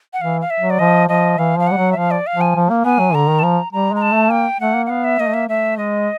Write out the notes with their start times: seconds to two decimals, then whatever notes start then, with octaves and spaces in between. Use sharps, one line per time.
0.13 F#5
0.21 E3 F5
0.41 F5
0.50 E5
0.60 F#3
0.70 D5
0.79 F3 D#5
1.09 F3 D#5
1.38 E3 F5
1.58 F3 F5
1.67 G3 F#5
1.77 F#3
1.92 E5
1.97 F3 F5
2.11 D5
2.27 F5
2.36 F3
2.41 G#5
2.56 F3
2.70 A#3
2.85 B3 G#5
3.00 F#3
3.14 D3 A#5
3.29 D#3
3.39 A5
3.43 F3 A#5
3.72 G3 A#5
3.92 G#3 A#5
4.02 A5
4.12 A3
4.31 A#3 G5
4.60 A3 F#5
4.76 A#3
4.86 F#5
4.90 B3 F5
5.04 E5
5.19 A#3 D#5
5.27 A3
5.34 A#3 E5
5.48 A3 E5
5.77 G#3 D#5